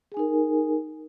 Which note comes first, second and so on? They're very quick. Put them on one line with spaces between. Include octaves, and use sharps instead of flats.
G#4 G#5 D#4 A#4